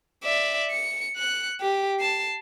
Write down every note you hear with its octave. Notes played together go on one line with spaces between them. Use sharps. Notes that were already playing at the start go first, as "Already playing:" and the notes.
D5 E5
C#7
F#6 C#7
G4
A5 C7